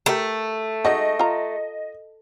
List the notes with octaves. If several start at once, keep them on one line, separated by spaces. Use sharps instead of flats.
A3 G4 A#4
G#3 D#4 F#4 D#5
F4 A#5